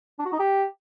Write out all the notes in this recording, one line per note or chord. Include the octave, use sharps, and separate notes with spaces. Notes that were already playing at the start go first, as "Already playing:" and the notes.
D4
F#4
D#4
G4